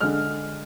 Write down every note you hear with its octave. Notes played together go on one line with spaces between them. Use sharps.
D3 G#3 F6